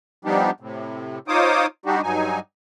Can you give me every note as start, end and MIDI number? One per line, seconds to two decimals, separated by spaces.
0.25 0.51 53
0.25 0.51 55
0.25 0.51 59
0.25 0.51 62
0.25 0.51 63
0.25 0.51 67
0.60 1.19 45
0.60 1.19 48
1.28 1.66 63
1.28 1.66 65
1.28 1.66 72
1.28 1.66 73
1.28 1.66 86
1.28 1.66 87
1.86 2.01 55
1.86 2.01 62
1.86 2.01 63
1.86 2.01 66
1.86 2.01 67
2.03 2.39 43
2.03 2.39 54
2.03 2.39 63
2.03 2.39 80